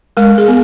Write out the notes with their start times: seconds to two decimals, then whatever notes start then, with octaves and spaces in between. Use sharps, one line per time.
0.17 G#3 A#4
0.38 G#4
0.48 B3